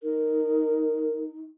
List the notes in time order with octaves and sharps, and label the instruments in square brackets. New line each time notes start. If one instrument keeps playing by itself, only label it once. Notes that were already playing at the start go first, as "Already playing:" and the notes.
[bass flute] D#4 [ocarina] A#4